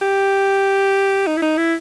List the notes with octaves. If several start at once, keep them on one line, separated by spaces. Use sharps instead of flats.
G4
D#4
E4
D#4
E4